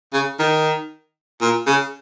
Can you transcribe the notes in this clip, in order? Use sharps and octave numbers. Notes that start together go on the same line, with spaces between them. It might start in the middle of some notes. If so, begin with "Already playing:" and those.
C#3
D#3
A#2
C#3